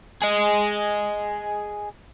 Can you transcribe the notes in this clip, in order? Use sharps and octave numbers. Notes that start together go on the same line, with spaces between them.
G#4 D#5